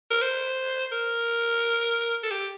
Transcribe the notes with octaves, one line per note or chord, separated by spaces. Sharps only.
A#4
C5
A#4
A4
G4